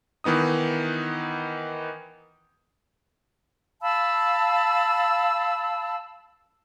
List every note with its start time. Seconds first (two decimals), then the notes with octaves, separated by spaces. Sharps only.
0.24 D#3 E3 B3 D#4 D#6
3.82 F5 A5 B5 E6